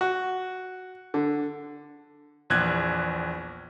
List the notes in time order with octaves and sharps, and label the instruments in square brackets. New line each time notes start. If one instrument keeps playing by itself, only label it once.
[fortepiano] F#4
D3
[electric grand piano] A#1 E2 F#6 G#6